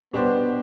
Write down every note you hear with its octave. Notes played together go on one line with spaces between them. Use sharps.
B2 G3 B3 D4 G4 C5